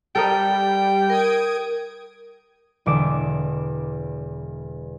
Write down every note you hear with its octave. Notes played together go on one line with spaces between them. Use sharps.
G3 A4 A#4 D#5 G5
A#4 D#6 G#6 D7
E1 E2 D3 D6 D7 E7